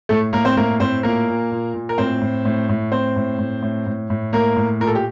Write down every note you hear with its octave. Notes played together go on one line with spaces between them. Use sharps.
A2 A3 A4
A2 A#3 A#4
C4 C5
A2 A#3 A#4
A2 C4 C5
A#2 A#3 A#4
A#2
A#2
A#2
A#4
A2 C4 C5
A2
A2
A2
A2 C4 C5
A2
A2
A2
A2
A2
A2 A#3 A#4
A2
A#2 A#4
A4
G4